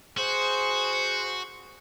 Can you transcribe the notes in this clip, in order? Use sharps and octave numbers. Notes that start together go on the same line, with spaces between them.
F#4 G#4 C5